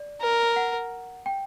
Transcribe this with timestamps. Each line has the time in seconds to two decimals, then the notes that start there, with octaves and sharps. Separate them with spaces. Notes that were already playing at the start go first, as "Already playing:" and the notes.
Already playing: D5
0.21 A#4
0.56 F#5
1.26 G5